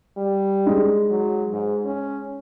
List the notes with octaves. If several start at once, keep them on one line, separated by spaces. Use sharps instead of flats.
G3
G#3 D#4
F#3
G#2
C#4